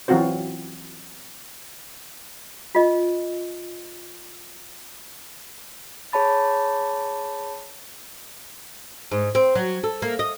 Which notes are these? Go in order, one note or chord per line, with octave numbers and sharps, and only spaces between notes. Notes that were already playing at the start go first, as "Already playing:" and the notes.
E3 F#3 C4 F4 F#4 C5
F4 D#5
G#4 C#5 A5 B5 A6
G#2
C4
F#3
A4
A#3
D#5